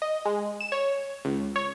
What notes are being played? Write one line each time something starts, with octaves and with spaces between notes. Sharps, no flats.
D#5
G#3
E7
C#5
C#2
C#5